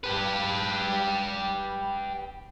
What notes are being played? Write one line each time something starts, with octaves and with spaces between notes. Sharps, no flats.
G4 B4